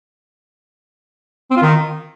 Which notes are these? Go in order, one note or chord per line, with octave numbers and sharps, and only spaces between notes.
C4
F4
D#3